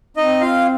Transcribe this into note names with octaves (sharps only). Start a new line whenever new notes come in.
C4 D#4 D#5
F4 F5